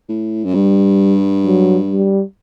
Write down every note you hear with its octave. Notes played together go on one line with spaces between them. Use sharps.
A2
F#2
G2 G3
F#3
G3